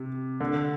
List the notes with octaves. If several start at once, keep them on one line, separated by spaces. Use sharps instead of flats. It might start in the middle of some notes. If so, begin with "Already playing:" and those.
Already playing: C3
D3